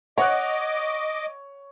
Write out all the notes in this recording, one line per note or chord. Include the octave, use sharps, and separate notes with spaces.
C#5 D#5 F#5 D6 F#6